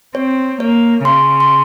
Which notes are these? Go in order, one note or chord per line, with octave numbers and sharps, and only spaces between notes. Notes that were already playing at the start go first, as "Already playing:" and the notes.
C4 C#5
A#3 C#5
C#3 C6
C6